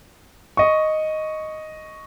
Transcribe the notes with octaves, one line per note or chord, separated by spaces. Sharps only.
D#5 C#6